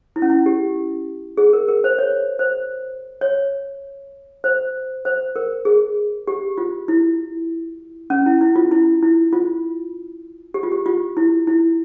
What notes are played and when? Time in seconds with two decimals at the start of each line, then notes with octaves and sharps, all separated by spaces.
0.16 E4
0.22 C#4
0.30 E4
0.46 G4
1.37 G#4
1.53 A#4
1.68 A#4
1.84 C5
1.99 C#5
2.39 C5
3.21 C#5
4.44 C5
5.05 C5
5.36 A#4
5.65 G#4
6.27 G4
6.58 F4
6.88 E4
8.10 C#4
8.26 E4
8.41 E4
8.56 F4
8.71 E4
9.03 E4
9.33 F4
10.54 G4
10.63 F4
10.72 G4
10.86 F4
11.17 E4
11.47 E4